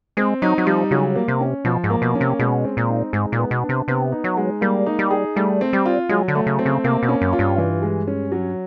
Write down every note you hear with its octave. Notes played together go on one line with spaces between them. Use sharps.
G#3 C4
F#3 D#4
F#3
F3 G3
C#3 F#3
A#3
C3
C#4
B2 F3
G#2
A#3
B2
C#4
C3
B2 G#3
C4
A#2
D#4
G#2 G#3
A#2
B3
B2
D4
C3
C3 B3
D#4
F#3
G#3
G3 A#3
D#4
G3
G#4
G3 A3
C4
G3
F4
F#3 G#3
D3
A3
C#3
C4
C#3
C3 A#3
B2
C#4
F#2
F4
G2
E3
G#3
C#4
F#3